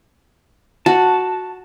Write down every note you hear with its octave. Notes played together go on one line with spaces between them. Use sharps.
F#4 A5